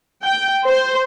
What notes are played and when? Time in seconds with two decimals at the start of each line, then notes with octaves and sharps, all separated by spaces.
0.24 G5
0.65 C5